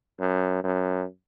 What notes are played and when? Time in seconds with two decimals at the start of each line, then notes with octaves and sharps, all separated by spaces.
0.20 F#2
0.64 F#2